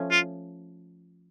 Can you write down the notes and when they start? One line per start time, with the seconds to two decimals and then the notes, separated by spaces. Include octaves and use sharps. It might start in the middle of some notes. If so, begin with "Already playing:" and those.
Already playing: F3 A3 C#4
0.11 F4